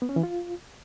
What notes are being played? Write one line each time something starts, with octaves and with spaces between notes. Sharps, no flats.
B3
C#4
E3
F4